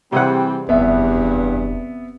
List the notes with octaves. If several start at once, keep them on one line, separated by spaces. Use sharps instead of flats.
C3 E3 G3 C4 G#4 F#5
F1 E2 G2 B3 E5